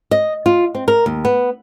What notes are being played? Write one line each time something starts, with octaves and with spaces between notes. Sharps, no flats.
D#5
F4
C4
A#4
D#2
B3